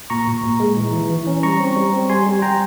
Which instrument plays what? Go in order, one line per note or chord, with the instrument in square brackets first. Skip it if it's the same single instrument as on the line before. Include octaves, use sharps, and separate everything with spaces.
[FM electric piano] A#2 A#5 C#6
A#2
A#2
G#3
E3
E3
E3
C#4
G3 A#5 C#6
C4
G3
C4
G3 G#5 C6
G3
G3 G5 A#5